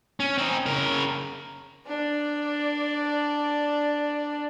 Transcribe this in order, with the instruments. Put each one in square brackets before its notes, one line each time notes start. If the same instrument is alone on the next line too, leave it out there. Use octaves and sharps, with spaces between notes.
[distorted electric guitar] C#4
C4 D#4
C#3 A#4
[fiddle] D4 D5